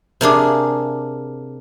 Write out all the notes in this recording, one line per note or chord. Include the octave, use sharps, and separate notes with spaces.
C3 A#3 D4 G#4